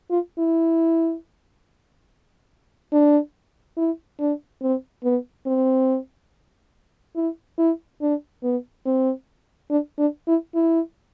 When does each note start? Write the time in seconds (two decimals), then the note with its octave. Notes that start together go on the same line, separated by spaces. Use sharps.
0.10 F4
0.38 E4
2.93 D4
3.77 E4
4.20 D4
4.62 C4
5.04 B3
5.46 C4
7.16 E4
7.58 E4
8.02 D4
8.43 B3
8.86 C4
9.70 D4
9.99 D4
10.28 E4
10.55 E4